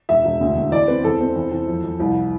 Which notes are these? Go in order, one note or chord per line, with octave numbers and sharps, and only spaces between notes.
E1 E5
E1
D2
D2
E2 D5
C4 B4
E2 A4
C4
E2
E2
F2
F2
C2